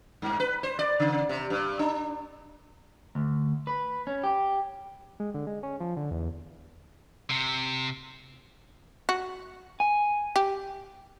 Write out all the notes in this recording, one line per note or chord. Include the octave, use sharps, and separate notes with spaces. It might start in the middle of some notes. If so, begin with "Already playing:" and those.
G2
B4
C5
D5
C#3
C3
G2
D4
D2
B4
C#4
G4
G#3
D3
G#3
C#4
F3
D3
E2
C3
F#4
G#5
G4